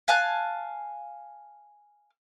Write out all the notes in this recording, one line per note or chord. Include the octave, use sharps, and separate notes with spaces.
F5 G#5 A5 F#6